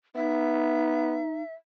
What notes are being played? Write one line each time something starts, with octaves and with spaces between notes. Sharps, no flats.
B3 D#4 E5